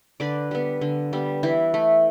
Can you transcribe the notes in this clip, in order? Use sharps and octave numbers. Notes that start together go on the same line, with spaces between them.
D3 B4 D5
G3 B3
D3
G3 B3
E3 E4
A3